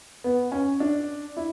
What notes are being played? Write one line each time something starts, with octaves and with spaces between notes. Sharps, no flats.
B3
C#4
D4
E4